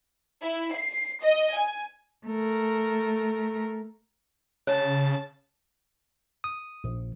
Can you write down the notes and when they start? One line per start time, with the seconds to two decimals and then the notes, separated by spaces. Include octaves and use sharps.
0.42 E4
0.75 C7
1.23 D#5
1.55 G#5
2.26 A3 A#4
4.67 C#3 C#5 A5
6.44 D#6
6.84 A#1